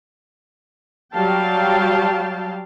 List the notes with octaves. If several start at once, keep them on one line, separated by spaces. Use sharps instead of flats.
F#3 G3 F5 G5 A5